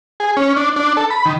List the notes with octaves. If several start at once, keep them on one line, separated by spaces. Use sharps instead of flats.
G#4
C#4
D4
D4
A4
B5
D#3